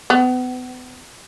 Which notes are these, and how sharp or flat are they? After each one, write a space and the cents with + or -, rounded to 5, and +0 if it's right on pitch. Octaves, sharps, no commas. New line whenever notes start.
B3 +35